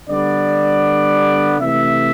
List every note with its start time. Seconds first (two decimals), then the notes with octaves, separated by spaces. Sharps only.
0.10 D3 G3 B3 D5
1.59 C3 E3 A3 E5